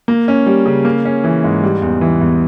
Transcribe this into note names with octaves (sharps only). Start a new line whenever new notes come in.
A#3
C#4
G3
C#3
A#3
C#4
E3
G#2
G3
E2
E3
E2